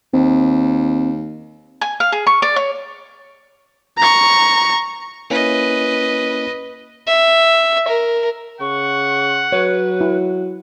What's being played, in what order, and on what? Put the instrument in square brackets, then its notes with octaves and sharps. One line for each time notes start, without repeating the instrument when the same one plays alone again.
[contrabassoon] D#2 [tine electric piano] C4
[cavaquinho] G#5
F5
G#4
C#6
D5
C#5
[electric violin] A#5 C#6
[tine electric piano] A#3 C#4 E4 [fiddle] B4 D#5
[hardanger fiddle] E5
A#4
[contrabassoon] C#3 [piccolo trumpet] F#5 [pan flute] C#6
[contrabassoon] F#3 [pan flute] B4 [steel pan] C#5
[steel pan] E4